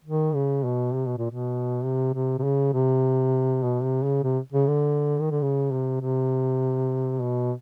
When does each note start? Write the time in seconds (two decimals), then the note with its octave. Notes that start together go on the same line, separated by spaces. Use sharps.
0.05 D#3
0.35 C#3
0.64 B2
0.94 C3
1.07 B2
1.18 A#2
1.30 B2
1.84 C3
2.14 C3
2.39 C3
2.44 C#3
2.74 C3
3.63 B2
3.83 C3
4.03 C#3
4.23 C3
4.52 C#3
4.67 D3
5.20 D#3
5.31 D3
5.42 C#3
5.72 C3
6.02 C3
7.21 B2